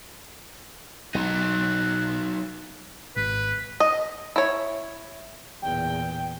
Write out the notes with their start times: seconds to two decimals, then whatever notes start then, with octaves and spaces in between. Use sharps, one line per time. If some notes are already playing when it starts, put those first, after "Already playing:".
1.15 B1 F#3 D#4 F#6
3.16 G#1 B4
3.80 D#5
4.36 E4 C#5
5.62 E2 A#2 G5